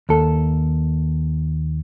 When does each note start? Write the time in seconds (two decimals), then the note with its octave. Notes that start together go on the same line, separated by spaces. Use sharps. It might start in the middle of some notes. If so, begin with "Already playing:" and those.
0.09 D#2 A4